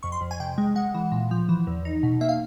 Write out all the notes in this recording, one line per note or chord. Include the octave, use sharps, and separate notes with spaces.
F2 C#6
C6
F2
G#5
C3 G5
G#3
G#3 F#5
E3
A#2
F3
E3
E2
D#4
B2
A#3 E5
F5